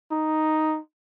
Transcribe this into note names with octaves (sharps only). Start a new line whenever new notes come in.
D#4